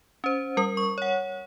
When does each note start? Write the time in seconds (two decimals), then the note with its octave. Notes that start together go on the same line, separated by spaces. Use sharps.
0.24 C#4 C5
0.57 G3 A#4 D#6
0.77 C#6
0.98 C#5 F#5